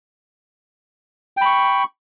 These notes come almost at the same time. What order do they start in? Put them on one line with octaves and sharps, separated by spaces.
G5 B5 C#6